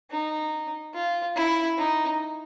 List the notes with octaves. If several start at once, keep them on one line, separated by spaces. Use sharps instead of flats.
D#4
F4
E4
D#4